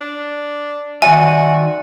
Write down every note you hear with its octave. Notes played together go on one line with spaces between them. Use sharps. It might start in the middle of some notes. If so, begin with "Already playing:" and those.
D4
D#3 F#4 D5 E5 G#5